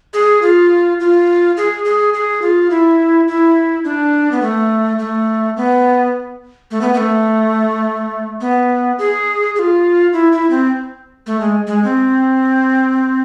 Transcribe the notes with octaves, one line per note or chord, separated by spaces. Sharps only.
G#4
F4
F4
G#4
G#4
G#4
F4
E4
E4
D4
B3
A3
A3
B3
A3
B3
B3
A3
B3
G#4
G#4
F4
E4
E4
C4
A3
G#3
G#3
C4